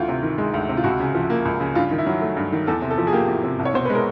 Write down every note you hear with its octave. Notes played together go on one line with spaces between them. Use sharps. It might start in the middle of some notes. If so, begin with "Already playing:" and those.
Already playing: D2 E3 F4
C3
D#3
G#3
D2
C3
F4
C#2 F#4
C#3
F3
A#3
C#2
C#3
G2 F4
D#3
E4
F#3
A3
G2
D#3
E2 A4
C3
A4
F3
G#4
A#3 G4
E2
C3
C2
C#5
B2 C5
G#3 B4
A#4